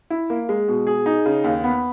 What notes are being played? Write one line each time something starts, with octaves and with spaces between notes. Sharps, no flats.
E4
A#3
G#3
B2
G#4
D#4
C#3
D#2
B3